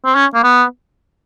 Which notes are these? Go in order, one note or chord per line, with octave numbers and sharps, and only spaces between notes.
C4
C#4
A#3
B3